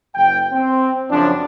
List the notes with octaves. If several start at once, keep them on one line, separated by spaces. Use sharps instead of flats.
F#1 G5
C4
F#2 C#3 F3 C#4 D4